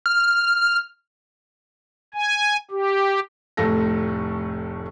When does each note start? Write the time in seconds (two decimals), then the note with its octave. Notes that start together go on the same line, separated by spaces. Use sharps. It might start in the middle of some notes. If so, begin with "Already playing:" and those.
0.06 F6
2.14 G#5
2.71 G4
3.57 F1 A2 A3 A4 A#6